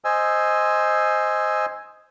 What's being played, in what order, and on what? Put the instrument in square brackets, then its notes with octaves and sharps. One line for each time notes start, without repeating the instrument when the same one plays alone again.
[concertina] C5 D#5 G#5 E6